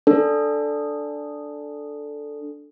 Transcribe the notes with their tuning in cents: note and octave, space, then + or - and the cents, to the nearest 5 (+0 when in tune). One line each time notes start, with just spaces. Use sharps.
D4 +0 A4 +0